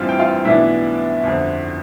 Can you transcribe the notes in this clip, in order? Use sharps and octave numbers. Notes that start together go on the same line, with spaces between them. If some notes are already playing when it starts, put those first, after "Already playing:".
Already playing: A1 G2 E3 G3 C4 F4 F5
G5
F4 F5
B1 A2 E3 B3 D4 E4 E5
G1 F2 D3